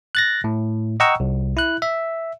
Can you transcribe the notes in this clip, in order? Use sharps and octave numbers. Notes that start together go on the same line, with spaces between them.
F#6 A6 A#6
A2
D#5 F#5 G5 A#5 C#6 E6
C2
E4 F#6
E5